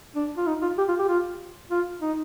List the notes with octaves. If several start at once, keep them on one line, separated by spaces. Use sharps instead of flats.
D4
F4
D#4
F4
G4
F4
G4
F4
F4
D#4